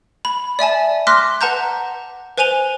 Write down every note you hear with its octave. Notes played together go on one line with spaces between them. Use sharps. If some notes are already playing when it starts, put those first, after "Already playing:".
B5
D5 E5 G#5 A5
C6 D6 F6 F#6 A#6 B6
B4 F#5 A5 A#5 G6
B4 C5 G#5 D#7 F7 G7